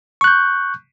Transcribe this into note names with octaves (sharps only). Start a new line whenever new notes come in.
C#6 F#6 G6